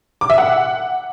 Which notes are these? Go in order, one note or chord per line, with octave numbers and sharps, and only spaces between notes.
D6
E5
F#5